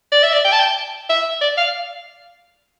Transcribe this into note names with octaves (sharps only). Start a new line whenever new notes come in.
D5
E5
D5
G5
A5
G5
E5
D5
F5